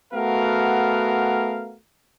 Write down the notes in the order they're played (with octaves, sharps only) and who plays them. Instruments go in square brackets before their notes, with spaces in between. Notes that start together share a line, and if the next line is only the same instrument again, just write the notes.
[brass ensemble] A3 B3 F#4 A#4 F5